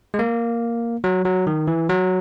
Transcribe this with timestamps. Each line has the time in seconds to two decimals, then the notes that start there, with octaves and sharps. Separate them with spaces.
0.14 G#3
0.19 A#3
1.04 F#3
1.25 F#3
1.47 D#3
1.68 E3
1.89 F#3